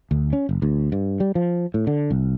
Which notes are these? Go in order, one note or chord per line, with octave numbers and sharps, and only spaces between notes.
D2
C#4
F#1
D2
G2
G3
F3
A2
D3
C2